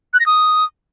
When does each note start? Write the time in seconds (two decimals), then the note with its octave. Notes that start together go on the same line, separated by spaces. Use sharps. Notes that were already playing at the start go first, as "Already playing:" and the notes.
0.13 F#6
0.20 A#6
0.26 D#6